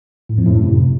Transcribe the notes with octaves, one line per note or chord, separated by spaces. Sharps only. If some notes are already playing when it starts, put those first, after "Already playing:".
A2
F2
A2
F#2
C3